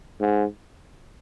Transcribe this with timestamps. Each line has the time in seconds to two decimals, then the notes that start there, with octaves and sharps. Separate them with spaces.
0.20 G#2